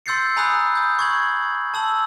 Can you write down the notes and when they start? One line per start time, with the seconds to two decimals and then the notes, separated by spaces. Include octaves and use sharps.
0.06 C6 E6 G6 A6 C7 C#7
0.36 G#5 A#5 B5 D#6 E6 F#6
0.75 D#6 G6
0.99 C#6 G#6 F#7
1.74 A5 E6 F#7